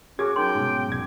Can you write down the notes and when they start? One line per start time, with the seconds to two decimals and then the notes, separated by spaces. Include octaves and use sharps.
0.19 C#4 F#4 G#4 C#6 D6 G#6
0.36 F#3 C#4 D#4 A#4 G5 C6
0.55 G#2 B2
0.88 E1 G#6